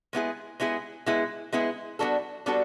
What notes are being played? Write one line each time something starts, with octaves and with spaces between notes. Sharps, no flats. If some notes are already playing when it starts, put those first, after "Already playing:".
G#3 B3 E4 G#4
G#3 B3 E4 G#4
G#3 B3 E4 G#4
G#3 B3 E4 G#4
G3 B3 D4 F#4 A4
G3 B3 D4 F#4 A4